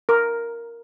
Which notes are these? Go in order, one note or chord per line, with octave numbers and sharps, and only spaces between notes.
A#4